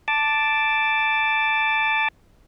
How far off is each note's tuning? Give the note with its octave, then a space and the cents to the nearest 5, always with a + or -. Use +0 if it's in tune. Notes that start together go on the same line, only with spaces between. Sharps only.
A5 +0 D6 +0